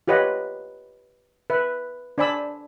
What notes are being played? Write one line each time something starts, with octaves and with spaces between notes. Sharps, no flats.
F4 G4 B4 C#5 D#5 F#5
B4 E5
D4 C5 D5 G#5 B5 E6